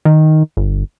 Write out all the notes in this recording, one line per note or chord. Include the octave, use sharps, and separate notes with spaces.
D#3
G1